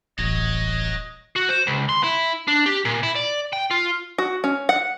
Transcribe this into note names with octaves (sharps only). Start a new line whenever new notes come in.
D#1 A1 F#4 C#5 D#5
F#4
C5
C#2
C6
E4
D4
G4
A#2
E4
D5
G5
F4
F#4
C#4
F#5